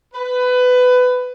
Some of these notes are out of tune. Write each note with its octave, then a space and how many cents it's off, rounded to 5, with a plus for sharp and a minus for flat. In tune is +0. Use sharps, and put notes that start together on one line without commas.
B4 +20